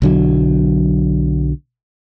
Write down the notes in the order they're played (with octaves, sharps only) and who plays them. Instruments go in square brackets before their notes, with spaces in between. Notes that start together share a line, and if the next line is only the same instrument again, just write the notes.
[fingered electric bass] B1 D3 F#3